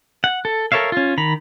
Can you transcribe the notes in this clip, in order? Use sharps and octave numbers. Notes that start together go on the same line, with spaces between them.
F#5
A4
A4 A#4 C#5 E5 F5
C#4 F4
D#3 A#5 B5